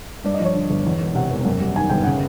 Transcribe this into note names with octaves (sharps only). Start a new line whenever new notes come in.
G2 D5
D#5
F3
C#5
D3
G1
E2
E1
C3 F#5
E1
F#2
G3
D#3 G#5
G1 G5
C#3 F#5